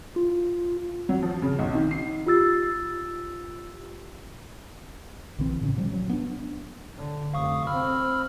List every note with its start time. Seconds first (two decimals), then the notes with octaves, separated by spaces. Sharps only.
0.16 F4
1.09 F#3
1.23 F3
1.42 C#3
1.59 B1
1.75 D#3
1.91 C7
2.26 F4 G4 E6 A6
5.38 A#1 D3 E3 C4
5.61 A2 C#3 C#4
5.76 A#2 F3 G3
5.92 F#3
6.09 B3 C4 D4
6.97 D3
7.34 F1 F5 C#6 D#6
7.67 C4 B5 E6 F6